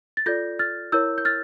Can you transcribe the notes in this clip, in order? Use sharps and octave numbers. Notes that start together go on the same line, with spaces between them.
A6
F4 A4 D5 G6 A#6
F6 A6
E4 A#4 C#5 E6 G6
G6
F6 A6